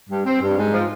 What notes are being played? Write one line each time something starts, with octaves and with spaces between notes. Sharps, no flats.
G2
C4
G2
G#2
F3